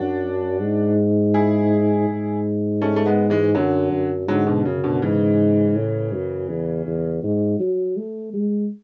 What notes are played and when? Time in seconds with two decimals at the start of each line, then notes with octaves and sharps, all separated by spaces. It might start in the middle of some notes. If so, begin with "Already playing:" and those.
Already playing: F#2 D4 F#4
0.61 G#2
1.34 E4 G#4
2.09 G#2
2.82 A3 C#4
2.96 A3
3.06 G#3 B3
3.30 E3 G#3
3.55 F#2 D3 F#3
3.92 F#2
4.28 G#2 D3 F#3
4.47 B2 D3
4.65 F#2 C#3
4.84 B2 D3
5.02 G#2 C#3 E3
5.76 A2
6.13 F#2
6.49 E2
6.86 E2
7.23 G#2
7.59 F#3
7.97 A3
8.33 G#3